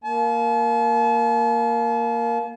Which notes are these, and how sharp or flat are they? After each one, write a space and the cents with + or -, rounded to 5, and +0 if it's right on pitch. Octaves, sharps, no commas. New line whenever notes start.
A#3 +0 A5 -40